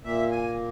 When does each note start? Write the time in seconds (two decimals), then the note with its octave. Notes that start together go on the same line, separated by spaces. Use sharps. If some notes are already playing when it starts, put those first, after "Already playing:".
0.03 A#2 A#3 E5
0.31 G#5